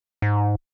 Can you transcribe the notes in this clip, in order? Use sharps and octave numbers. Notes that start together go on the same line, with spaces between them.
G#2